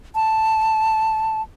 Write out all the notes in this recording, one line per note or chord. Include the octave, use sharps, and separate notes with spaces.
A5